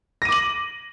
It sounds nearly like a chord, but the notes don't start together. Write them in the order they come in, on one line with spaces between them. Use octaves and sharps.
A#6 D#7 D6 F#7